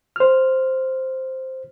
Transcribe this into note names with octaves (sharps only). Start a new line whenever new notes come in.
C5 F6